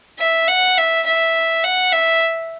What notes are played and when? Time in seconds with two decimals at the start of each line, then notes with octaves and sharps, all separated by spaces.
0.19 E5
0.48 F#5
0.78 E5
1.06 E5
1.64 F#5
1.92 E5